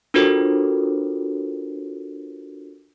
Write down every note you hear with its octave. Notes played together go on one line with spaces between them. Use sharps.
D4 F4 F#4 A4 A#4 C5